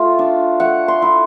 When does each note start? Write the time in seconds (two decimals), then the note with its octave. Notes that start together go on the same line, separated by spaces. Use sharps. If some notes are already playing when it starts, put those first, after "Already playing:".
Already playing: A3 F4 F5
0.19 D4
0.60 A3 F#5
0.88 C6
1.02 E4